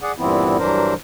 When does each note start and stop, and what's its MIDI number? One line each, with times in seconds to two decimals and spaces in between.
0.01 0.12 68
0.01 0.12 74
0.01 0.12 78
0.18 0.57 43
0.18 0.57 46
0.18 0.57 52
0.18 0.57 59
0.18 0.57 60
0.18 0.57 64
0.58 0.94 43
0.58 0.94 52
0.58 0.94 54
0.58 0.94 62
0.58 0.94 70
0.58 0.94 72